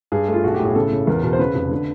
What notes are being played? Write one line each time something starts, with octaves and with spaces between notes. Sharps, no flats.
G2 G#4
A3 F4
B1 F#4
G4
A2
G#4
C#3 A4
C#3
E2 A#4
B2 A#4
C5
C#3 B4
F1
D3